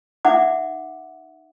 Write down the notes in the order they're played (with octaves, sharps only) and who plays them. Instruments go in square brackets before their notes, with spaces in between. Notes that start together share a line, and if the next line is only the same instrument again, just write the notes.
[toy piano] D#4 E5 F#5 D6